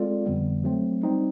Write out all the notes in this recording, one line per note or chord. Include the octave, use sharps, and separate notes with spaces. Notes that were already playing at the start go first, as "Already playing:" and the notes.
Already playing: G#3 C4 F4 A4 D5
F2 D3 G3 B3
F#3 A3 C4
G3 C4 D#4